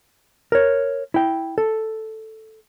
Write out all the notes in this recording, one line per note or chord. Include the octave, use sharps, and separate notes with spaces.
A#4 C#5
E4 G5
A4